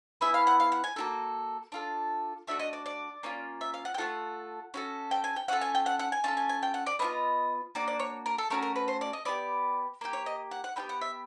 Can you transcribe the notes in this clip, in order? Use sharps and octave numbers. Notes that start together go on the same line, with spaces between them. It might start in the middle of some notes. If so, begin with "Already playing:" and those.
B3 E4 G#4 E5
F5
F#5
F5
F#5
G#5
A#3 D4 F#4 A4
D4 F4 A4
A3 D4 F#4 A4 E5
D#5
D5
D5
A#3 C#4 F4
E5
F5
F#5
G5
A3 C4 F4 A4 F#5
C#4 F#4 A4
G5
G#5
G5
C#4 F4 A4 F#5
G#5
G5
F#5
F#5
G#5
C#4 F4 A4 A5
G#5
G#5
G5
F#5
D5
B3 D4 F4 D#5
A#3 D4 F#4 D5
D5
C#5
A#4
A4
A3 C#4 F#4 A#4
A#4
B4
C5
D5
D#5
B3 D4 G4 D5
A#3 D#4 G4
C#5
D#5
F#5
F#5
B3 D4 G4 G5
F#5
E5